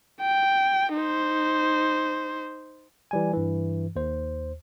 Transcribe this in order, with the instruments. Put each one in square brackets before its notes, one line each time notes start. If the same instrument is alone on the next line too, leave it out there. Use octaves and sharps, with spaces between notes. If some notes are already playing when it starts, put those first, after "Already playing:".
[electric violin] G5
D#4 C5
[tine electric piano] E3 G3 G#5
G2 E3
D#2 C5